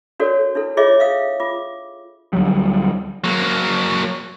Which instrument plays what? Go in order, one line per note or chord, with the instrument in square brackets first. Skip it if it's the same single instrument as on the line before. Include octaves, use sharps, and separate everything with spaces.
[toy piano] D4 F#4 A4 A#4 C#5 D5
D4 E4 A4
F4 G#4 C#5 D#5 E5 D6
E5 F5 D#6
F4 D6
[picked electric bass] D2 F#3 G3
[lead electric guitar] F#3 A#3